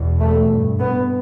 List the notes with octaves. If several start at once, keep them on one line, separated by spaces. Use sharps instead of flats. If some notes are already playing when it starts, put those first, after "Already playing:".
Already playing: E2 B2
A3
G2
B3